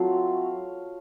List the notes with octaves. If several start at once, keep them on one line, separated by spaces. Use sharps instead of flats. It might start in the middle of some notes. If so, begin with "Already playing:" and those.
Already playing: F#3 A3 C4 F4 F5